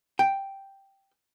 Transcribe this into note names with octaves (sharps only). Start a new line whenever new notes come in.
G5